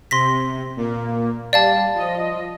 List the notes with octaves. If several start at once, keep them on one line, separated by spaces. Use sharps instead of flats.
C3 C6 A#6 B6
A#2 A#3
G3 D5 F5 A5
F3 D#5